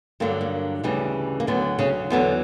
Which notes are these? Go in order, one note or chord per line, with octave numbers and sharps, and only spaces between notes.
G2 D3 F#3 A#3
A#3
D2 C#3 E3 G3
A#3
D2 D3 F#3 B3
C#3 C#4
E2 D3 F#3 B3